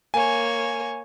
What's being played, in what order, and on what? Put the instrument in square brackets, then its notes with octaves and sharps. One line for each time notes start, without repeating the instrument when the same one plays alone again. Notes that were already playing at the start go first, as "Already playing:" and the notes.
[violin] A#3 C#5 [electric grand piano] G#5